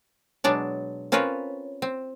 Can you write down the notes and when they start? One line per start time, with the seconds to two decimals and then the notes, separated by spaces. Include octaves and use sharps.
0.44 B2 F#3 G#3 D4 D5
1.12 C4 C#4 F4 A#4 B4 C#5
1.82 C4